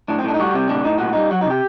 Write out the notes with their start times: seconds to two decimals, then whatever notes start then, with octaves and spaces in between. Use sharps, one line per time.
0.08 A2 D4
0.18 C4
0.24 A2 D4
0.34 D#4
0.39 G3 F#4
0.54 C3 C4
0.69 A2 D4
0.84 A2 D#4
0.98 A#2 F#4
1.13 G3 D#4
1.31 F#3 F#4
1.41 D#4
1.46 C3 G4